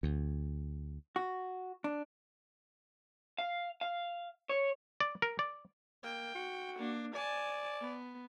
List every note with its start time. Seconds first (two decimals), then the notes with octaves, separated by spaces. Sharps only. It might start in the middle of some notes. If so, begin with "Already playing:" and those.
0.03 D2
1.16 F#4
1.84 D4
3.38 F5
3.81 F5
4.49 C#5
5.00 D5
5.22 A#4
5.39 D5
6.04 A#3 G5
6.35 F#4
6.78 A#3 D4
7.15 D5 G#5 A5
7.81 B3